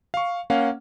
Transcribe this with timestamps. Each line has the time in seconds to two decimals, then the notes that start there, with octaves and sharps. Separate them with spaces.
0.14 F5 C#6
0.50 A#3 C#4 F5 F#5